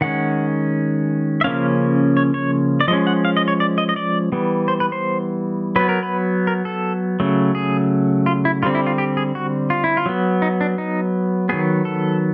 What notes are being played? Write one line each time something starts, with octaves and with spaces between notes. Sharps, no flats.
D#3 G#3 C#4 F#5
E5
C#3 F3 A#3 C#4 F5
C#5
C#5
D5
F3 G#3 C#4 D#5
F#5
F5
D#5
C#5
D5
D#5
D#5
D5
E3 G3 B3
C5
B4
C5
F#3 B3 B4
A#4
B4
A#4
A4
C#3 F#3 A3
G#4
F4
E4
D3 G3 C4 F4
E4
F4
G4
G#4
F#4
F4
E4
F4
F#3 B3
D#4
D4
D#4
D#3 F#3 B3 G#4
A4